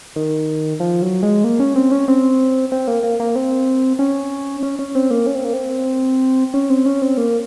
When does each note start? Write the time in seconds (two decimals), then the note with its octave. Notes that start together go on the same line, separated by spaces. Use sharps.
0.16 D#3
0.80 F3
1.02 F#3
1.23 G#3
1.44 A#3
1.60 C#4
1.76 C4
1.92 C#4
2.08 C4
2.72 C4
2.87 A#3
3.03 A#3
3.20 A#3
3.35 C4
3.99 C#4
4.63 C#4
4.79 C#4
4.95 C4
5.11 A#3
5.27 C#4
5.35 C4
5.44 A#3
5.53 C4
6.54 C#4
6.70 C4
6.86 C#4
7.02 C4
7.17 A#3